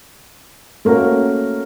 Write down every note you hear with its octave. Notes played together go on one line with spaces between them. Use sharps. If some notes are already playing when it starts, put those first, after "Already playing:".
A3 A#3 C#4 F#4 A#4